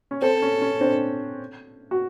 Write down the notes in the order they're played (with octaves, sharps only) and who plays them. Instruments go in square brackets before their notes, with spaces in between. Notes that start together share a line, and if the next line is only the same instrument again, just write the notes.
[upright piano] C#4
[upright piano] C4 [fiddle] A4
[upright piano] C#4
C#4
C4 D4
F#4